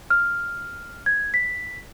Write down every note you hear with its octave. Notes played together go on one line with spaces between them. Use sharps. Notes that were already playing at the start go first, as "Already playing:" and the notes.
F6
G#6
B6